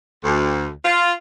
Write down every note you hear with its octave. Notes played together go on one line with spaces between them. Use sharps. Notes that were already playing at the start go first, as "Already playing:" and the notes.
D2
F4